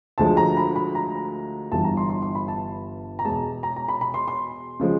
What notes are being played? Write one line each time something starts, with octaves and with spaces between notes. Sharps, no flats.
D2 D3 F3 G#3 A5
A#5
B5
B5
A#5
G1 G2 E3 A5
A#5
C6
C6
C6
B5
A5
A#5
E2 B2 G#3 A5
A#5
A#5
B5
B5
C6
C6
C#3 F3 G#3